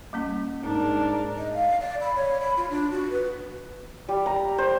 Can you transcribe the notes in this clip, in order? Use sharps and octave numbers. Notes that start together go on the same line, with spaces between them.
G3 A#3 C#4
G#2 D4 A#4
D#5
F5
D5
B5
C#5
B5
F4
D4
F#4
B4
G3
A#5
C5